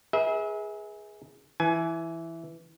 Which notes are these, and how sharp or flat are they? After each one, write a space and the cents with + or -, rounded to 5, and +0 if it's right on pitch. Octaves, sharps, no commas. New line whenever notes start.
G#4 +0 B4 -40 E5 -35
E3 +0 G#5 +20